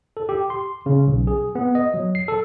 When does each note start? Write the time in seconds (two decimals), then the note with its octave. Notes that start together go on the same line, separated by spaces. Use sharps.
0.17 A4
0.29 G4
0.50 C6
0.86 C#3
1.07 B1
1.27 G#4
1.55 B3
1.75 D#5
1.94 F#3
2.15 C7
2.28 A4